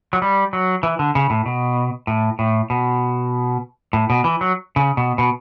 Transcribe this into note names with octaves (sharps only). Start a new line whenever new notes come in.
F#3
G3
F#3
E3
D3
C#3
A2
B2
A2
A2
B2
A2
B2
E3
F#3
C#3
B2
B2